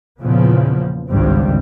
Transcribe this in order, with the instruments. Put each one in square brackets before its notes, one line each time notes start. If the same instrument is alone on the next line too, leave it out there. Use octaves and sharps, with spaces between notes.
[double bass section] E2 A#2 C#3 F3 B3
G#1 C#2 G2 D#3 G3 C4